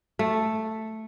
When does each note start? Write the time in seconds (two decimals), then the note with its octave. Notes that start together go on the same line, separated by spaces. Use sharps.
0.19 A3